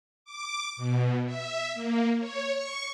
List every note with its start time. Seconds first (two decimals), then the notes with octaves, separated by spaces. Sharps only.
0.25 D6
0.77 B2
1.26 E5
1.74 A#3
2.19 C#5
2.52 C#6